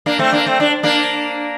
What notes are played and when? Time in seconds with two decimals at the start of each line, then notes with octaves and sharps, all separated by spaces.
0.06 A#3 D4
0.19 A3 C4
0.32 A#3 D4
0.46 A3 C4
0.60 D4
0.83 A#3 D4